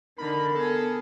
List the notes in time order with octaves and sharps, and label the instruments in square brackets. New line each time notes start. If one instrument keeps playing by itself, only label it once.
[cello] D3 D#4 [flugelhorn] A#4 [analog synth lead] B5
[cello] B3 G#4 [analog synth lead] A4